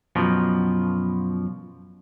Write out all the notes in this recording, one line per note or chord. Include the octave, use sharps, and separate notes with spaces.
F#2 B2 F3